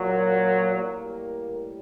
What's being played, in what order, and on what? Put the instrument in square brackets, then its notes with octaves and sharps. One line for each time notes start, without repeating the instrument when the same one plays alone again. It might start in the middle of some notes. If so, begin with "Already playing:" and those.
Already playing: [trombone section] A#2 F#3
A2 G3 A#3